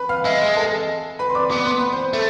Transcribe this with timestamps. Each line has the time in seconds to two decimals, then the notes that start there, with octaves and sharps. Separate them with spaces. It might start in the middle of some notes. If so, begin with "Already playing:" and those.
Already playing: B4 B5
0.09 F5 F6
0.25 G#3 E5 E6
0.57 A4 A5
1.19 B4 B5
1.30 C6
1.35 D5 D6
1.51 B3 D5 D6
1.66 C6
1.79 B5
1.93 C5 C6
2.14 A3